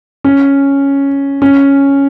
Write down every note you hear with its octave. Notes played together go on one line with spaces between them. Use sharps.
C#4
C#4